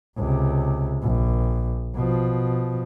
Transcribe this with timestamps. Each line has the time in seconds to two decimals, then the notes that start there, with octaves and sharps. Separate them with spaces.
0.17 C#2 C3
1.03 A#1
1.95 B2 F3